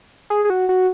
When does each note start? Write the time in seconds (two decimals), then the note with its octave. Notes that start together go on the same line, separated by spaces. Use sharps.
0.30 G#4
0.45 G#4
0.50 F#4
0.69 F#4